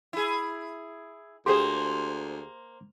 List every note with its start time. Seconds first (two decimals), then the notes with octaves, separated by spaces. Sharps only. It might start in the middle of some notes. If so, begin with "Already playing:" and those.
0.13 E4 G#4
1.46 D2 A#3 G4 G#4 C5 C6